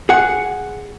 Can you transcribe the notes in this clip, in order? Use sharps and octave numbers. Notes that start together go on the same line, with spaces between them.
G#4 F#5